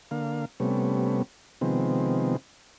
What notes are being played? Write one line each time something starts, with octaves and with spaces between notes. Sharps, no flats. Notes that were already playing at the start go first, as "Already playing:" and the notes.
D3 A#3 F5
C3 G3 A3 B3 C#4
C3 D#3 F3 G#3 B3 C4